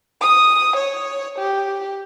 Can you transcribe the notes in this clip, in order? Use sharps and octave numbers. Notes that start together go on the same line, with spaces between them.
D#6
C#5
G4